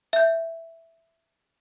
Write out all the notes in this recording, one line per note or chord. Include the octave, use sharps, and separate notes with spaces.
E5 G6